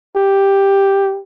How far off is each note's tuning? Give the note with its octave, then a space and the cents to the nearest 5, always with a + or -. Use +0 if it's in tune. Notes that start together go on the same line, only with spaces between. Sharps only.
G4 +5